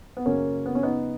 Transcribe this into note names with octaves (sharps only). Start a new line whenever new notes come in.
B3
F#2 C#3 F#3 A#3 C#4
B3
C#4
B3 D#4